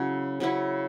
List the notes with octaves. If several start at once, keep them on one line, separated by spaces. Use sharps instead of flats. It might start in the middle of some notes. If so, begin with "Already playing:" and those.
Already playing: C#3 F#3 C#4 E4
C#3 F#3 C#4 E4